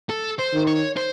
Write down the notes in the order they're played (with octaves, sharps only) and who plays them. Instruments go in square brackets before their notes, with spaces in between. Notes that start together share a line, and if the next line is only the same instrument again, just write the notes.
[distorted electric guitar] A4
C5
[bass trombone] D#3
[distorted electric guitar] C#5
C5